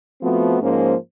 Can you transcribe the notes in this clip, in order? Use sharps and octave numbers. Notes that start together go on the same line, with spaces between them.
F3 A3 B3 C4 F#4
G#2 F3 A#3 C#4 C5